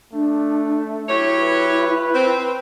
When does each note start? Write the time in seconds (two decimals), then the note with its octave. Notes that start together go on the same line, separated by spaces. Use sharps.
0.13 A3 D4
1.08 F#3 E4 G4 C#5
1.41 B4
2.14 C4